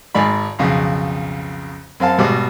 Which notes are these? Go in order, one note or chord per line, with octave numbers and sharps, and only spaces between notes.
G#1 G#2 D5 B5
B1 F2 C#3
F#2 C4 F5 A5
G#1 B2 G3 D6